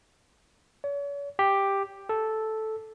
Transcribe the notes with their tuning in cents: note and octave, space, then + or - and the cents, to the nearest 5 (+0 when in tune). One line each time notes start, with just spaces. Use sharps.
C#5 +40
G4 +5
A4 -5